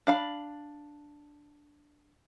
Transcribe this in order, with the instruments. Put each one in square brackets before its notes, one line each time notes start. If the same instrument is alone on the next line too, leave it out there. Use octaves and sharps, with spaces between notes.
[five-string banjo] D4 F5 B5